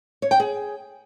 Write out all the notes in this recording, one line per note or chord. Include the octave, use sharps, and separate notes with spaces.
C#5
G5
G#4